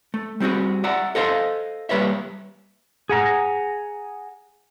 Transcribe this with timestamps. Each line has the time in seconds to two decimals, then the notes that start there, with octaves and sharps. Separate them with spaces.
0.14 A3
0.40 G3 C4 E4 F#4 G#4
0.84 D5 E5 F#5 A#5
1.15 A4 C5 D#5 F5 G#5 C6
1.89 G3 A#3 B4 C#5 E5
3.09 G#4 F#5 A#5